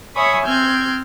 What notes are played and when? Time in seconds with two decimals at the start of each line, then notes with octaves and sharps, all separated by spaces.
0.15 C#5 E5 G#5 B5 C#6 D#6
0.45 C4 F6 G6 G#6